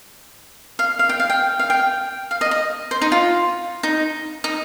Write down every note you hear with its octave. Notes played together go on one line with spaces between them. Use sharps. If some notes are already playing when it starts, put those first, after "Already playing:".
F5
F5
G5
F5
G5
F5
G5
F5
D#5
D#5
C5
D#4
F4
D#4
D#4